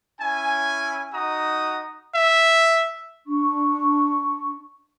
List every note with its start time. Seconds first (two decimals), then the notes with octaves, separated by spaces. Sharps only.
0.20 C#4 E4 G#5
1.14 D#4 F#4 A#5 D#6
2.15 E5
3.27 D4 C#6